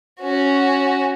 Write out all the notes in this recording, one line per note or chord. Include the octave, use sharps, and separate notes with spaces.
C#4 F#4